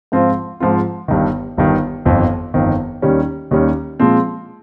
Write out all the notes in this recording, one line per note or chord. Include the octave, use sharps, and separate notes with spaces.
G#2 F3 C4 F4
G#2 F3 C4 F4
G1 G2 D#3
G1 G2 D#3
G1 F2 D#3
G1 F2 D#3
D#2 D#3 G3 C#4
D#2 D#3 G3 C#4
A#2 F3 G#3 C4